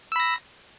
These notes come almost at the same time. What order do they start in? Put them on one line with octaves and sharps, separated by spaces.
E6 B5 A#6